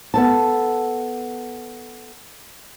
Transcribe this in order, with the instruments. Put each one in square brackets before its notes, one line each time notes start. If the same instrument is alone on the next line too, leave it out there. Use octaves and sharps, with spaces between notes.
[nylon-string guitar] B3 A4 A5